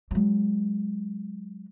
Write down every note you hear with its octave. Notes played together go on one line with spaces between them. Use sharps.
F#3 G#3